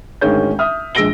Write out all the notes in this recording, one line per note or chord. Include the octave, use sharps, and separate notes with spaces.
G#1 D2 D#3 G#3 C#4 G6
E5 D#6 F6
A#1 G#3 E6 A#6 D7 G7